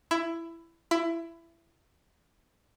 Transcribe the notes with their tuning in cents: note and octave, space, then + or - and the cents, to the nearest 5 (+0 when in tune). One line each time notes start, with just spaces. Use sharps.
E4 +15
E4 +20